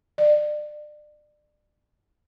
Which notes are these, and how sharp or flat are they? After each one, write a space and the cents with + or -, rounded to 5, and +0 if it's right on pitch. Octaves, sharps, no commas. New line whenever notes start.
D5 +30